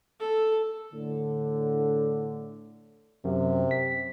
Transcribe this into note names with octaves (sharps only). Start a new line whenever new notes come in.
A4
A2 D3
F#2 C3
B6